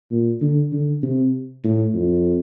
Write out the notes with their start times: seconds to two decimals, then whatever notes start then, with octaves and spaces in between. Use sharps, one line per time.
0.11 A#2
0.41 D3
0.72 D3
1.03 C3
1.64 A2
1.94 F2